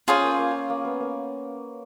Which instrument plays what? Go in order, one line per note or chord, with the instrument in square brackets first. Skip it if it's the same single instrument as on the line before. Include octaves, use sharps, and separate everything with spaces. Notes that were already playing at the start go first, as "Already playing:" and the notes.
[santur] C#4 [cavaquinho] F4 G#4 C5
[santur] A#3
A#3
A#3
B3
A#3